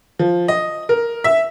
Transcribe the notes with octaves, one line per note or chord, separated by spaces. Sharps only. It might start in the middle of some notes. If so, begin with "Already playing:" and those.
F3
D#5
A#4
E5